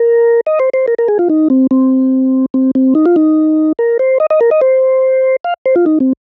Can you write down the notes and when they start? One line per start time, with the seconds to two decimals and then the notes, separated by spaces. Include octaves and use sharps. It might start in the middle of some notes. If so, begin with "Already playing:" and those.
Already playing: A#4
0.46 D#5
0.60 C5
0.74 C5
0.88 A#4
0.98 A#4
1.08 G#4
1.19 F4
1.29 D#4
1.50 C4
1.71 C4
2.54 C4
2.75 C4
2.95 D#4
3.06 F4
3.16 D#4
3.79 A#4
3.99 C5
4.20 D#5
4.30 D#5
4.41 A#4
4.51 D#5
4.61 C5
5.44 F5
5.66 C5
5.76 F4
5.86 D#4
6.00 C4